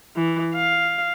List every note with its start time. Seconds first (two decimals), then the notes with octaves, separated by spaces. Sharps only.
0.16 E3
0.54 F5